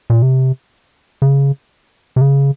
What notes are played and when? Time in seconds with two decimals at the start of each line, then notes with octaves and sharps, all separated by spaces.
0.10 A#2
0.22 C3
1.22 C#3
2.16 C3
2.21 C#3